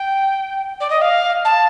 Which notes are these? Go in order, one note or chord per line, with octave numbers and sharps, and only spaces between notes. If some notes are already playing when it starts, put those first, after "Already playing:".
Already playing: G5
D5
D#5
F5
A5